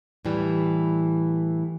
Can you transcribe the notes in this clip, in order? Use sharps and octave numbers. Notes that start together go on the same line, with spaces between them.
A2 E3 G3